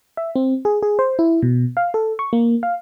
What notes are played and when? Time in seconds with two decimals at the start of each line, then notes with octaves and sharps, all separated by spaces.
0.17 E5
0.36 C4
0.65 G#4
0.83 G#4
0.99 C5
1.19 E4
1.42 B2
1.77 F5
1.94 A4
2.19 C#6
2.33 A#3
2.63 F5